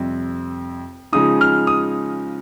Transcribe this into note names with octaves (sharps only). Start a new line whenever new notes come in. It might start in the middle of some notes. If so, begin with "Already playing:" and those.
Already playing: F2 C3 G3 C4
C#3 F3 G#3 D#4 D#6
F6
D#6